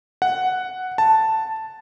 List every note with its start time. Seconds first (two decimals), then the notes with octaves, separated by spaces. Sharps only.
0.22 F#5
0.98 A5